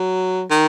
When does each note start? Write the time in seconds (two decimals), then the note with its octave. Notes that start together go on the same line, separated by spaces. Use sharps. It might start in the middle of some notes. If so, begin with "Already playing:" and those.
Already playing: F#3
0.51 D#3